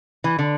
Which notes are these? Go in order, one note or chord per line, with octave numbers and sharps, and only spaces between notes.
E3
D3